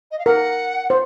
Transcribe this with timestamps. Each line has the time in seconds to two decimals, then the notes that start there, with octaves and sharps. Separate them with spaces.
0.11 D#5
0.19 F5
0.26 A#4 F#5
0.90 C5